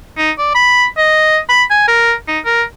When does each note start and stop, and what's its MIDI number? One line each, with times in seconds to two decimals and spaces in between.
0.18 0.31 63
0.38 0.54 74
0.55 0.86 83
0.97 1.37 75
1.49 1.63 83
1.70 1.86 80
1.88 2.13 70
2.28 2.39 63
2.45 2.62 70